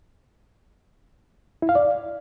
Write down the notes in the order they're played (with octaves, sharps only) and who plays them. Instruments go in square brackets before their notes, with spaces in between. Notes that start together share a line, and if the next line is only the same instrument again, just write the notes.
[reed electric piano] E4
F5
D5